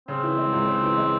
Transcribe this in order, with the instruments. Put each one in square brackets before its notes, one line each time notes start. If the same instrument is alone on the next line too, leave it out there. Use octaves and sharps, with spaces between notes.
[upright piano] C#3 [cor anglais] C4
[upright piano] E3
G#3
C#2
C#3
E3
G#3